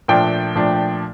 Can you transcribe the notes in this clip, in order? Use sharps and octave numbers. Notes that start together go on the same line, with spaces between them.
A#2 F3 A3 D4 G5
A#2 F3 A3 D4